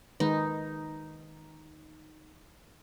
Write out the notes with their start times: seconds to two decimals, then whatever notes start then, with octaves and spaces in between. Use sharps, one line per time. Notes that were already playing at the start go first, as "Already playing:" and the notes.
0.20 D#3 G#3 D#4 B4